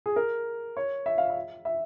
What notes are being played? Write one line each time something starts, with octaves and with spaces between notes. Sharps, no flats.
G#4
A#4
C#5
E5
F5
E5
E5